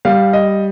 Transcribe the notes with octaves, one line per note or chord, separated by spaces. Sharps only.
G3 F5
D#5